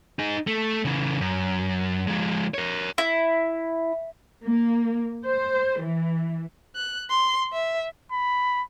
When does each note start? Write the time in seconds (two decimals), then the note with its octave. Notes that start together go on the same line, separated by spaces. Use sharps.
0.19 D#4 G#4
0.47 A3
0.85 C#3 E3
1.21 F#2
2.07 F3 G#3
2.54 A#4 C#5
2.98 E4
4.44 A#3
5.24 C5
5.81 E3
6.76 F#6
7.10 C6
7.53 E5
8.12 B5